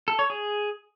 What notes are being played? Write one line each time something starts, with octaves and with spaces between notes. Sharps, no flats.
A4
C#5
G#4